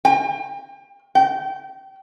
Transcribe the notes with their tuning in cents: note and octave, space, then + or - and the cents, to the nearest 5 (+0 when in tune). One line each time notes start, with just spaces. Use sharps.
G5 +35
G5 -25